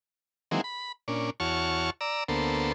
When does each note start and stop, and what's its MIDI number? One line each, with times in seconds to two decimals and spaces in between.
0.51 0.61 51
0.51 0.61 52
0.51 0.61 54
0.51 0.61 56
0.51 0.61 58
0.51 0.61 60
0.64 0.92 83
1.08 1.30 46
1.08 1.30 61
1.08 1.30 62
1.40 1.90 40
1.40 1.90 66
1.40 1.90 73
1.40 1.90 81
1.40 1.90 85
1.40 1.90 89
2.01 2.24 74
2.01 2.24 82
2.01 2.24 88
2.28 2.72 38
2.28 2.72 58
2.28 2.72 59
2.28 2.72 69
2.28 2.72 72